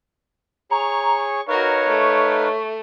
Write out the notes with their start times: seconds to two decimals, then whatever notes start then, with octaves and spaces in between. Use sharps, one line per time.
0.71 G#4 C#5 A#5 C#6
1.48 D#4 F#4 A#4 B4 C#5 F5 C#6
1.88 A3